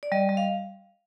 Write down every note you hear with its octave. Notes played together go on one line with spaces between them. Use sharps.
D5
G3 D#5
G3
F5